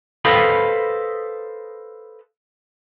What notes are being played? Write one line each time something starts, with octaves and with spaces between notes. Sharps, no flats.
A4 B4 C5 D#5 F5 B5